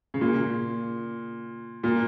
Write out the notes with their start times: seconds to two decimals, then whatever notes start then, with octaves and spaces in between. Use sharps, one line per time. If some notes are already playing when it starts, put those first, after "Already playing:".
0.14 C#3
0.21 A#2
1.84 A#2